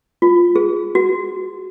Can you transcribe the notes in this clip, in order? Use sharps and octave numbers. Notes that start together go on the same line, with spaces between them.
F4
G#4
F#4